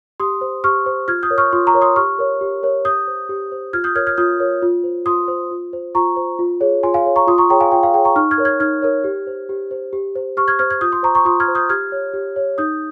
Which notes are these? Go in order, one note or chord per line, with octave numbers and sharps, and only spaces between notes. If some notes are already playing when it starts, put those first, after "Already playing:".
G4 C6 D#6
C5
G4 C#6 F6
C5
F4 F6 G#6
D#6 G6
A#4 C#5
C#6 F6
F4 C6 D#6
A#5 C#6
A#4 C#5
C6 D#6
G4 C#6 F6
A#4 C#5
G4
A#4 C#5
G4 D#6 G6
C5
G4
C5
F4 F6 G#6
D#6 G6
A#4 C#5 F6 G#6
F6 G#6
F4 D#6 G6
A#4 C#5
F4
C5
F4 C6 D#6
C5
F4
C5
F4 A#5 C#6
C5
F4
G#4 C#5
F4 G#5 C6
F5 G#5
G#4 C#5
A#5 C#6
F4 C6 D#6
A#5 C#6
G#4 C#5 G5 A#5
F5 G#5
F4 G5
F5
G#4 C#5 G5
A#5 C#6
D#4 C#6 F6
F6 G#6
A#4 C#5
F6 G#6
D#4 F6 G#6
A#4 C#5
G4
C5
G4
C5
G4
C5
G4 C#6 F6
F6 G#6
C5 F6 G#6
F6 G#6
F4 D#6 G6
C6 D#6
C5 A#5 C#6
A#5 C#6
F4 C6 D#6
F6 G#6
C5
D#6 G6
G4 F6 G#6
C#5
G4
C#5
D#4 D#6 G6